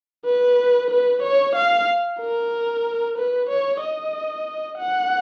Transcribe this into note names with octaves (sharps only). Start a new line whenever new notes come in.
B4
B4
C#5
F5
A#4
B4
C#5
D#5
F#5